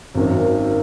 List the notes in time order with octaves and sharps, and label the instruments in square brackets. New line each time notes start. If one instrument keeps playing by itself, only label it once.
[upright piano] G#1 F#2 D#3